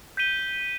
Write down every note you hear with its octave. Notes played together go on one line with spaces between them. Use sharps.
G6 B6 D#7 G7